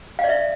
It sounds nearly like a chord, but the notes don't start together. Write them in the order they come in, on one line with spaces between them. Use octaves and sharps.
F5 D5 E5